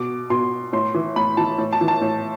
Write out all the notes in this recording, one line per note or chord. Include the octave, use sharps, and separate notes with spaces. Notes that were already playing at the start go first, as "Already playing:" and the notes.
Already playing: B2 D6
B2 C6
A2 C6
E3
A2 B5
E3 A5
A2
A5
E3
A5
A2